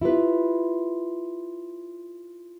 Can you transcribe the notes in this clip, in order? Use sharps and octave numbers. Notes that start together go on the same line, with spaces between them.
E4 F4 G4 B4